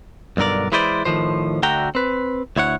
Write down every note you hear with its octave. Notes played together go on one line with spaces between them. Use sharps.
B1 G2 D3 A#4 D5
E3 G#3 E4 B4 C5 D5
A2 D#3 F3 C5
D2 D3 A3 F#4 G5 A#5
C4 B4
D2 E4 C#5 F#5